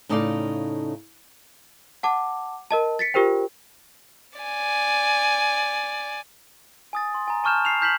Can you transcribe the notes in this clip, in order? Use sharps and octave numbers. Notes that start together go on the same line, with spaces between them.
A2 C#3 D#4 A4 D5 F5
F#5 A5 D6
A#4 D#5 A5
A6 B6 C#7
F4 G4 A#4 C5 G5
D5 G#5
G#5 D#6 A6
C6
G#5 A#5
G#5 A5 C#6 F6 G6 E7
C7 F7
F6 G6 B6 E7 F#7